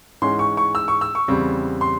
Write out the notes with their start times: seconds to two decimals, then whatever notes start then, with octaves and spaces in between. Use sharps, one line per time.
0.22 G#2 E3 G#3 C#4 C6
0.39 C#6
0.57 C#6
0.75 E6
0.88 C#6
1.01 E6
1.15 C#6
1.28 E2 C#3 G3 C4
1.81 C6